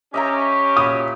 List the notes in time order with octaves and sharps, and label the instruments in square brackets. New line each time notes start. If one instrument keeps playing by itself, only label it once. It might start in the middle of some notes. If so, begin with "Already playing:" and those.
[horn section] C#4 G4 [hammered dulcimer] D#5 E5 A#5
[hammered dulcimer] A#2 B5 [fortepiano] D#6